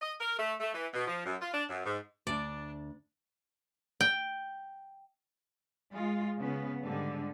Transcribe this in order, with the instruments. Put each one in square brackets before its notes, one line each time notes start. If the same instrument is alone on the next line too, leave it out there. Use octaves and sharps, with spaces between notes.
[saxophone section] D#5
A#4
A3
A3
E3
B2
F3
F#2
F4
D4
F#2
G#2
[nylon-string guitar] D2 A5 [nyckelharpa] D4 [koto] D5
[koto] G5
[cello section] G#3 F4
C#3 B3
G#2 D3 G3